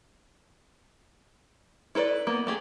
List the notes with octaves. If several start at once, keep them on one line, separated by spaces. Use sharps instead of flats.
E4 A4 B4 C5 D5
A#3 B3
A3 G4 G#4